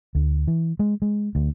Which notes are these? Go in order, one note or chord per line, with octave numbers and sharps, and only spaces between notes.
D2
E3
G#3
G#3
D2